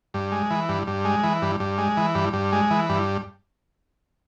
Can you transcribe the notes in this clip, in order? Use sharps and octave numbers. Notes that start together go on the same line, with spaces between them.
G2
G#3
E3
G2
G2
G#3
E3
G2
G2
G#3
E3
G2
G2
G#3
E3
G2